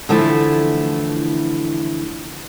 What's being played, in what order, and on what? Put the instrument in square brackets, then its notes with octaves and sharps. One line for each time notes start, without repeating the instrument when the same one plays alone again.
[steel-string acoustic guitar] D3 E3 F3 A3 E4